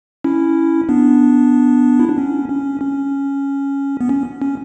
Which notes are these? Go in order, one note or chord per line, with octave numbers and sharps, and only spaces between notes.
C#4 E4
B3 D4
E4
D4
C#4
C#4
C#4
B3
C#4
C#4